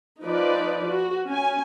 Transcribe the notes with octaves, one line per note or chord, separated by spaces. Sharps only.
F3 D#4 B4 D5
F#4
C#4 G#5